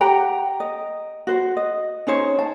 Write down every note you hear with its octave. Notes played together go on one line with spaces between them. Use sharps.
G4 F#5 G5 A#5
D#5
F#4 C5
D#5
C#4 D#4 C5 C#5
A5